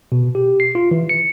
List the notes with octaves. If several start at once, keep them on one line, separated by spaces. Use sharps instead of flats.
B2
G4
C7
F4
E3
C#7